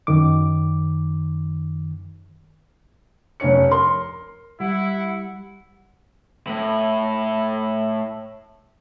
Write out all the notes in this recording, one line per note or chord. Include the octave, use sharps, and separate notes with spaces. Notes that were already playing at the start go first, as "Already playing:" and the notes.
F#2 D#3 D6
F1 C#4 C#5 C#7
A#4 C6
G3 E4 F#5
A2 E4